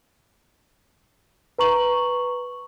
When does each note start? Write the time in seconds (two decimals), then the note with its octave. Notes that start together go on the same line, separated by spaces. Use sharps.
1.59 B4 A#5 C#6 F#7